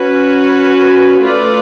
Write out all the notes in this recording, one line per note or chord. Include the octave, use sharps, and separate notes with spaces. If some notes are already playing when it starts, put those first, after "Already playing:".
Already playing: C#4 F#4 B4
A3 F4 B4 D5